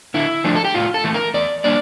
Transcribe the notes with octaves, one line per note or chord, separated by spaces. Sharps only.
D3 E4
F3 A3 D4
A4
G4
A2 F4
A4
E3 A3
A#4
E2 D5
G3 A#3 D4 D5